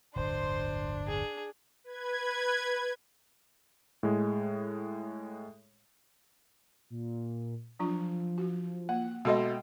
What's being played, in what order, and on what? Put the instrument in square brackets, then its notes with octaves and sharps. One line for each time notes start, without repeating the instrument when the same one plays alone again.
[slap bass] D1 G1 E2 [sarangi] D4 [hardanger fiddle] C5 C6
[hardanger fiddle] G#4
[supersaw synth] B4 G#6
[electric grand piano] A2 G#3
[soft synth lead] A#2
[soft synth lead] F3 [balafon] F#3 D4 F4
[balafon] F#4
[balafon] A#3 [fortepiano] F#5
[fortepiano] B2 A4 D#5 [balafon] G#3 E5 C6 [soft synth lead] G5